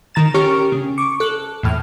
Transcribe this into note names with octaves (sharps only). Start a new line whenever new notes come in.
D#3 A#5 A6 E7
C#4 G4 A#4 C#6 F6 D7
C#3
C#6 D6
A4 F#6
E2 A2 F6